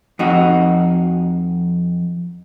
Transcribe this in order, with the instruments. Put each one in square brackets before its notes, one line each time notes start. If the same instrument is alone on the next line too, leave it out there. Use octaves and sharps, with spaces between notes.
[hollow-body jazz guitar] F2 D#4 F#4